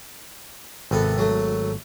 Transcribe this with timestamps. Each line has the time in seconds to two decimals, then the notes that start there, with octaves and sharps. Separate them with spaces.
0.91 G#1 C3 B3 A4
1.18 F#3 A3